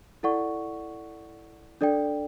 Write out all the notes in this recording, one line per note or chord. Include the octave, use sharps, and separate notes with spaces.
E4 A4 D5 F#5 C#6
D4 A4 D5 G5